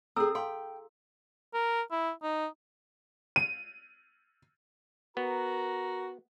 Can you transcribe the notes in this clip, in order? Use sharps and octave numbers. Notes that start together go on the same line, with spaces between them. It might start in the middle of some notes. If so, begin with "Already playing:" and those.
C4 G#4 A4 A#5 E6
F5 G5 C6
A#4
E4
D#4
D#7
B3 F#4 A#4 A#5